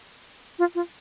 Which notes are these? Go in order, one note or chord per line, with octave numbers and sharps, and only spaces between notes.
F4
F4